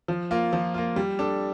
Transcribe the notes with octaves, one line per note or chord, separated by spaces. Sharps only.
F3
A#3 F4
F3
A#3 F4
G3
D4 A4